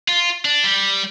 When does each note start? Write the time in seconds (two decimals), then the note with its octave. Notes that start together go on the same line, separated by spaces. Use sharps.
0.08 F4
0.45 D4
0.64 G3